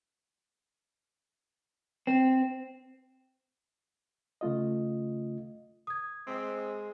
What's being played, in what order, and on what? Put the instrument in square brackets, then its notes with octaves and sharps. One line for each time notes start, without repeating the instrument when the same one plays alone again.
[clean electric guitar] C4
[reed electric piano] C#3 A3 F4 D#5
[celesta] D#6 G#6
[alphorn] G#3 [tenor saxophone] C4